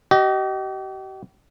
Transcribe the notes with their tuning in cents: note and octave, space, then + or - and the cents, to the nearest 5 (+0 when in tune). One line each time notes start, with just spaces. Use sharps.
G4 -40 D#5 +0